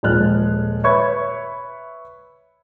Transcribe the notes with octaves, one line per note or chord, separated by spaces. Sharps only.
D#1 F3 G#3 F6 F#6
B4 C#5 E5 B5 C#6 G#6